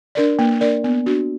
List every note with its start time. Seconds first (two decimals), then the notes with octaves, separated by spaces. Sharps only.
0.15 D4 A#4 D5
0.39 A#3
0.61 D4 A#4 D5
0.84 B3
1.06 D4 F#4